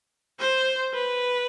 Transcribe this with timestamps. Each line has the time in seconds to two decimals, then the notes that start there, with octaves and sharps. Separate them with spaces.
0.40 C5
0.94 B4